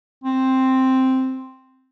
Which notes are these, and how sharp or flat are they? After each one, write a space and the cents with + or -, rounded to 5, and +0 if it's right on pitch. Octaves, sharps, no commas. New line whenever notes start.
C4 +0